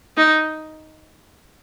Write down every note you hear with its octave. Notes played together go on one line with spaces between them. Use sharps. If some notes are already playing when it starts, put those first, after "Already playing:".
D#4